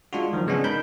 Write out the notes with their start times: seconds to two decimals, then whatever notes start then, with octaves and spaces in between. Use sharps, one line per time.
0.13 G#3 D4 F4 F#4
0.33 D#3 F3 F#3
0.47 C#3 G#3 B3 C#4 D4
0.64 D#4 A#4 B5 G6